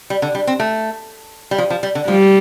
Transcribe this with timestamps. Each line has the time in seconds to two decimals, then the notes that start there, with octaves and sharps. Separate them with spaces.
0.10 G3
0.22 D3
0.35 G3
0.47 C4
0.60 A3
1.51 G3
1.58 F3
1.70 F3
1.83 G3
1.95 D3
2.08 F3 G3